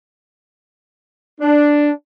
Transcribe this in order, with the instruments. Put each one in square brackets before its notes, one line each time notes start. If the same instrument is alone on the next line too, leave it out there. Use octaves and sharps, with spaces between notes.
[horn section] D4